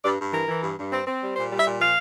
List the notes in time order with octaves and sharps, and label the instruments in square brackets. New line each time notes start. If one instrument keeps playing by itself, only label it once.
[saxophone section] G2 D5
G2
E3 A#4
E3
G2
G2
C4
C4
G3
A#2 C5
G3
E5
A#2
F3 F5